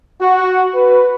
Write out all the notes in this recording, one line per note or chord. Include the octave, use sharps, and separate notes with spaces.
F#4
B4